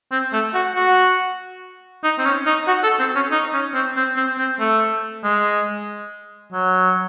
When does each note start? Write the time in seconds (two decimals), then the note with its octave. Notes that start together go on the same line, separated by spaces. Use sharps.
0.12 C4
0.33 A3
0.55 F#4
0.76 F#4
2.04 D#4
2.19 C4
2.25 C#4
2.46 D#4
2.68 F#4
2.83 A4
3.00 C4
3.16 C#4
3.32 D#4
3.54 C#4
3.74 C4
3.96 C4
4.17 C4
4.38 C4
4.60 A3
5.24 G#3
6.53 F#3